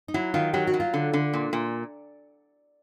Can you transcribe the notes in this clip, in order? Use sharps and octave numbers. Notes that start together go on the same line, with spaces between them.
D#4
F#3 E4
D#3 F4
F#3 G4
F#4
F#3
F4
D3
D3
A#2
A#2